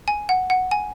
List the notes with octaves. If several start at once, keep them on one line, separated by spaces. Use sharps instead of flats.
G#5
F#5
F#5
G#5